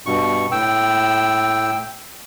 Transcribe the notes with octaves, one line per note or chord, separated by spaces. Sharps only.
G2 B2 C#6
A2 G5 E6